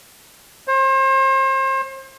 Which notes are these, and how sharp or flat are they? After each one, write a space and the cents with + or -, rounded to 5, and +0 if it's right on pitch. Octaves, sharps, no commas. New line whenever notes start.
C5 +35